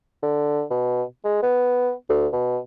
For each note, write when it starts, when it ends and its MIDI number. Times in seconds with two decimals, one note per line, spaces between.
0.23 0.63 50
0.71 1.03 47
1.24 1.40 56
1.43 1.91 59
2.09 2.27 38
2.33 2.58 47